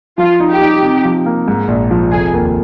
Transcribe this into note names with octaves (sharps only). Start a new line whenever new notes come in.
F3 F4
D#4
G4
D#4
C3
F3
A#3
G#2
A#1
F3
F1 G#4
D#2